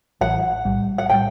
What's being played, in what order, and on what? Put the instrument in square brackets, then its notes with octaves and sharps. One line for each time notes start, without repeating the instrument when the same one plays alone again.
[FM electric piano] A1 A2 E3 [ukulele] F#5
[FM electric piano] B1 A2 G3
[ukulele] F#5
[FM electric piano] A2 G3 [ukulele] G5